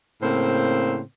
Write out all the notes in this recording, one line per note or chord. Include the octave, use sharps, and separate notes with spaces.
A2 C#3 A#3 C4 C5